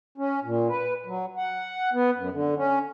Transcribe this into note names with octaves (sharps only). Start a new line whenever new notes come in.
C#4
A#2
B4
F#3
F#5
B3
F#2
D3
C#4